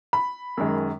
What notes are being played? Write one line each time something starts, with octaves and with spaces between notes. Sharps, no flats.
B5
F#2 D#3 G#3